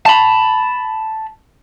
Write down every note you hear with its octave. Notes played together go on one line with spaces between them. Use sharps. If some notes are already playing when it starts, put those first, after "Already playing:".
A5 B5